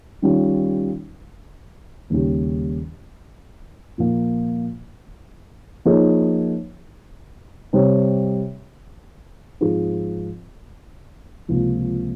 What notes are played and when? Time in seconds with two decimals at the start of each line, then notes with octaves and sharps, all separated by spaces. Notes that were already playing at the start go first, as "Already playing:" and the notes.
0.22 D#3 G3 C#4 F4
2.10 D#2 C#3 G3 C#4 G4
3.98 A#2 F3 A#3 F4
5.85 F3 A#3 D#4 G#4 C#5
7.73 C3 G3 C4 G4 C#5
9.61 G#2 F3 C4 F4 G#4
11.48 C#2 C3 F3 A#3 F4